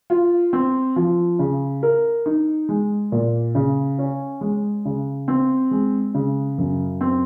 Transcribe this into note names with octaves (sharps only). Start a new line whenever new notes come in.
F4
C4
F3
C#3
A#4
D#4
G#3
A#2
C#3
C#4
G#3
C#3
C4
G#3
C#3
F#2
C4